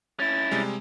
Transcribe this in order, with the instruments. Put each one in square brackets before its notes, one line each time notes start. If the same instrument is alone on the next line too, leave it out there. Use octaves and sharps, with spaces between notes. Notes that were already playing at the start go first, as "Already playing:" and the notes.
[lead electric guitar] C#4 E4 [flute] A6
[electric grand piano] C3 G3 G#3